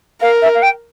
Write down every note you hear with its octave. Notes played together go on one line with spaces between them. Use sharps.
A#4 F5
E5
F5
G5